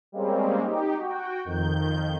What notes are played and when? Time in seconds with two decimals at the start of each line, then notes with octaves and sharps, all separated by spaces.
0.12 G3 G#3 A#3 C4 C#4
0.62 D#4 G4
0.96 F#4 G5
1.45 F2 D#3 G6